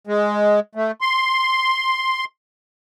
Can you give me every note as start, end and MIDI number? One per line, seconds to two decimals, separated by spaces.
0.07 0.60 56
0.75 0.91 57
1.01 2.25 84